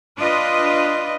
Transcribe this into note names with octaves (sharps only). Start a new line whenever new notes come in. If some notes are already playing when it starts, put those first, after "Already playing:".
D4 F4 B4 D#5